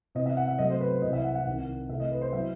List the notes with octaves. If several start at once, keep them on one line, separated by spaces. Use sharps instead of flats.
C3 E3 B3 D#5
E5
F#5
E5
C3 F#3 A3 D#5
C5
B4
C5
C2 C3 E3 D#5
E5
F#5
F#5
C2 C3 D#3
C3 E3 A3 E5
D#5
B4
C5
F#3 B3 E4 E5